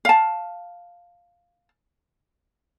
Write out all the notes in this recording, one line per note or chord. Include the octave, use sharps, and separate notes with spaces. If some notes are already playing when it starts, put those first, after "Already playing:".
F5 A5